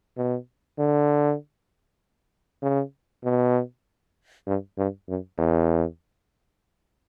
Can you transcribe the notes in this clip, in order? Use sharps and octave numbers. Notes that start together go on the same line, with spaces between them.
B2
D3
C#3
B2
G2
G2
F#2
E2